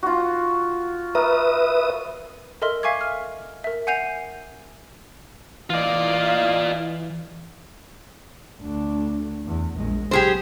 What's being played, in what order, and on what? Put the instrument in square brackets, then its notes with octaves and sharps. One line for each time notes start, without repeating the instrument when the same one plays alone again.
[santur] F4 F#4
[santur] A#4 [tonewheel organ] B4 E5 D#6
[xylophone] A4 A#4 D#5 E5 C6 F6
E5 F5 G#5 C#6 D6 G#6
F6
A#4 E5
F#5 G#5 G6 C7 D#7 F7
[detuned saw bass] E3 [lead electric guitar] F4 D5 [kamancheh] D#5 F5
[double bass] D2 D4
E2
A#1 G#3
[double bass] B1 [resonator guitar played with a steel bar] G4 G#4 C5